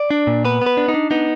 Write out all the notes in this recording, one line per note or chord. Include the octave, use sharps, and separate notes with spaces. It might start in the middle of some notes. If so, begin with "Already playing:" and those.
Already playing: D5
D4
A#2
B3 B4
B3 B4
D4
D#4
D4
B3 D#4